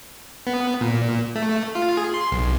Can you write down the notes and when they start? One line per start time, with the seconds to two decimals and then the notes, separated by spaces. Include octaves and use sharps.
0.47 B3
0.81 A#2
1.36 A3
1.75 F4
1.97 G#4
2.14 C6
2.32 B1